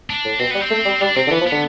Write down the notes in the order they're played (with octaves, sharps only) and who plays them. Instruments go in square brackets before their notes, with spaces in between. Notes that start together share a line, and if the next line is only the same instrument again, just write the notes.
[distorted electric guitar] D4
[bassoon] A2
[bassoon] B2 [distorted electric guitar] C4
[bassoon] G3 [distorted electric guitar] B3
[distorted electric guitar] C4
[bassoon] A3
G3
[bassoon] G3 [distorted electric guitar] D4
[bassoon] C3 [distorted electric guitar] C4
[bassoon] D3
[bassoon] E3 [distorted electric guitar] B3
[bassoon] F3
[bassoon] D3 [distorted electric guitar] B3